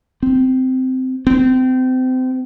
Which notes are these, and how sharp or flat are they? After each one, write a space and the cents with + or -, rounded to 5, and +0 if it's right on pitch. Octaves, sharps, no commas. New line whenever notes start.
C4 -15
C4 -30